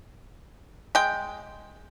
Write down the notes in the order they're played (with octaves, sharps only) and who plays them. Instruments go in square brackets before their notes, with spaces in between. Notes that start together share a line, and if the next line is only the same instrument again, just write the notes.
[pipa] G#3 G5